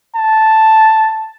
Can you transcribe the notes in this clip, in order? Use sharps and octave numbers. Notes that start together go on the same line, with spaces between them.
A5